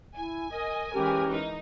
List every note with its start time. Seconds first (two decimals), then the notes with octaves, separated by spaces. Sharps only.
0.17 E4 G#5
0.52 A#4 D#5
0.94 E3 G#3 C#4 G4 A#4
1.30 D#4